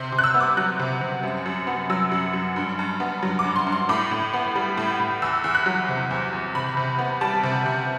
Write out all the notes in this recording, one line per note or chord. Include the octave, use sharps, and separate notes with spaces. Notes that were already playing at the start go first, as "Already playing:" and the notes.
Already playing: C3 C6
C3
F#6
E6
B3
D6
F#3 F#6
C3
C3
F#2
F#2
B3
F#3 E6
F#2
F#2
G2
G2
B3
F#3
D6
G2
C6
G2
C6
A2 D6
A2
B3
G3
A2
A2
E2 E6
E2
F#6
F#3
C3
E2
E2
C3 B5
C3
B3
G3 A5
C3
C3